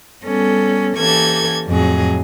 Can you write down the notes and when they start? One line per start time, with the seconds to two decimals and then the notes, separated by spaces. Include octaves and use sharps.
0.23 G3 B3 C#4 A4
0.96 E3 A#3 C#4 G4 A4 G#6
1.68 F2 A2 F#3 G#4